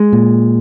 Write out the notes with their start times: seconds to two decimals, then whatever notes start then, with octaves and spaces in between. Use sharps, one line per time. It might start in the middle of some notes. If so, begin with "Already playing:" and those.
Already playing: G#3
0.13 A#2